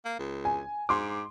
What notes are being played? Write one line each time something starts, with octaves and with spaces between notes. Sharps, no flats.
A#3
C#2
G#5
G#2 C6 D6